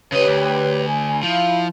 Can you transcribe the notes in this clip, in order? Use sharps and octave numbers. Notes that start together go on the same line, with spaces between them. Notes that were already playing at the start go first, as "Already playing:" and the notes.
C#3 G4 B4 C#5 D#5
D2
G#5
F3 E4 F5